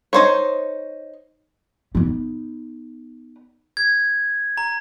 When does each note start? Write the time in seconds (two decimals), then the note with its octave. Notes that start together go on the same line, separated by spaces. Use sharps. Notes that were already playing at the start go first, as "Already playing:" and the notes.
0.13 D#4 C5 C#5
1.95 B3 D#4
3.77 G#6
4.57 A#5